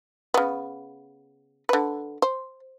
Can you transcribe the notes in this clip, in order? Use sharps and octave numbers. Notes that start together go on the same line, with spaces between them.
C#3 B3
D3 B4
C5